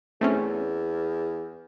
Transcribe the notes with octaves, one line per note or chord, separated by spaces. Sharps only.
E2 A3 C4 C#4